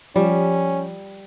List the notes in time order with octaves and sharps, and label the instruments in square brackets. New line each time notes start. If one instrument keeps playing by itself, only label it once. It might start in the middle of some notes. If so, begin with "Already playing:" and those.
[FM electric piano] F3 [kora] G3 [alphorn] C#4